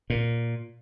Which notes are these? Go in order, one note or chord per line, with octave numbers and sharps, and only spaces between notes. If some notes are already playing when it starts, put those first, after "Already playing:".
A#2